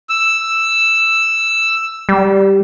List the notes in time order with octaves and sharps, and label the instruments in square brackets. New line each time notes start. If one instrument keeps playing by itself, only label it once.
[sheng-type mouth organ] E6
[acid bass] G3